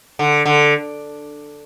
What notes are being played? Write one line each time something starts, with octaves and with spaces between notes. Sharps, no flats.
D3
D3